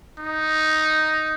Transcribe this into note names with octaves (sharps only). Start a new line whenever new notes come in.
D#4